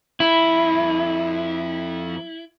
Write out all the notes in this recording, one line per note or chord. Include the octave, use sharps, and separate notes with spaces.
F2 E4 B5